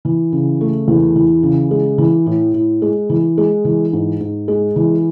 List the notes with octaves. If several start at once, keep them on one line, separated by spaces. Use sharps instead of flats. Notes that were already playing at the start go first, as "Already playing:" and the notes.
E3
C#3
A3
E2
E3
C#3
G#3
E3
A2
A2
G#3
E3
G#3
E3
G#2
G#2
G#3
E3